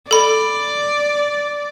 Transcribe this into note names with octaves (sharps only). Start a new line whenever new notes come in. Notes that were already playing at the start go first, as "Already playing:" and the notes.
A4 D5 B5